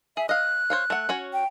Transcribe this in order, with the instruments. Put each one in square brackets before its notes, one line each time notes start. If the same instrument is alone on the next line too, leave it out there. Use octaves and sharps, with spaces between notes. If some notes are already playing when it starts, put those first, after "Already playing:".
[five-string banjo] G#4 [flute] E5
[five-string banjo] D#5 F5 [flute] F#6
[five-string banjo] C5 C#5 F5
A3 F#5
C#4 F#4 C#5
[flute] G5